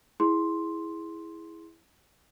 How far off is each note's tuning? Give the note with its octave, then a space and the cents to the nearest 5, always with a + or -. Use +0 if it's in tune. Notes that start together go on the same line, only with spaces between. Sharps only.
E4 +0 G#4 +0 C6 +0